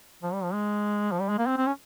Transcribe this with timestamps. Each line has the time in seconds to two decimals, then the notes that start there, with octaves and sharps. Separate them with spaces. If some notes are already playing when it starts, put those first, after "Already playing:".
0.23 F3
0.33 G3
0.43 F3
0.53 G#3
1.12 F3
1.20 G3
1.29 G#3
1.38 A#3
1.47 C4
1.57 C4
1.67 C#4